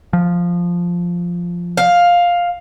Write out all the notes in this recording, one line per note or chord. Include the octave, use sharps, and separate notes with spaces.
F3
F5